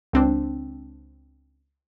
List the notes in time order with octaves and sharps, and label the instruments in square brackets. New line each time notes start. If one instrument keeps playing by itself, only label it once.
[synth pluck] C#2 C4 D4